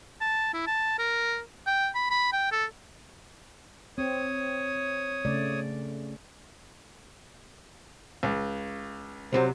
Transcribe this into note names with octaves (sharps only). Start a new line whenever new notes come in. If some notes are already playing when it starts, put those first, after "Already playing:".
A5
E4
A5
A#4
G5
B5
B5
G5
A4
C4 C#5 D#6
C#3 A3 D5
C#2
C2 C3 F#3 C5